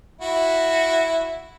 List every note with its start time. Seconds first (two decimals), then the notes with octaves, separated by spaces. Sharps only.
0.21 E4 F#4